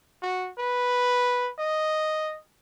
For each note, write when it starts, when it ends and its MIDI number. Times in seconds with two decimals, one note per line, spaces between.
0.22 0.49 66
0.59 1.49 71
1.59 2.37 75